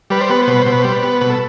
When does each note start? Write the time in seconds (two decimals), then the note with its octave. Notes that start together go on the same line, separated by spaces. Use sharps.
0.10 G3 B4
0.21 C5
0.30 B3 B4
0.42 C5
0.47 B2 B4
0.62 B2 C5
0.72 B4
0.82 G3 C5
0.92 B4
1.03 B3
1.21 B2 B4
1.30 A4